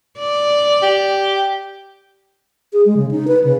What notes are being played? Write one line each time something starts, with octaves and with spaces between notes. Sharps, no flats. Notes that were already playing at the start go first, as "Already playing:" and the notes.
D5
G4
G#4
G#3
C#3
D#4
B4
C#3